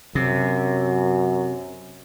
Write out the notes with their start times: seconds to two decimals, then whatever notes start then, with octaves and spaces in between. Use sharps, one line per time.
0.15 F#2 C3